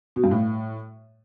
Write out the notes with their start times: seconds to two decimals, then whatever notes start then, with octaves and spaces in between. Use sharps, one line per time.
0.16 B2
0.24 G2
0.31 A2